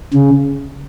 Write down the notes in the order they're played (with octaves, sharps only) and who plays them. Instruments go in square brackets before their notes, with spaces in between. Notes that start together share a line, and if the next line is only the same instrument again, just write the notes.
[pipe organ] C#3